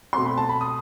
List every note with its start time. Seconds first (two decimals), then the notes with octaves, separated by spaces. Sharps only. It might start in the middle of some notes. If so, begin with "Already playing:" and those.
0.13 B2 A3 C4 C6
0.25 B5
0.37 A5
0.49 B5
0.61 D#6